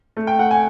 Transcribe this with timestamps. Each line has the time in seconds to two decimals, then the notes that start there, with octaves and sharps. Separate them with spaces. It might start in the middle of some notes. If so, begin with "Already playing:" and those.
0.17 A3
0.27 G5
0.39 A3 F#5
0.51 G#5